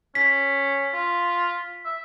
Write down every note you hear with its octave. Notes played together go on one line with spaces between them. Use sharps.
C#4 B6
F4
E5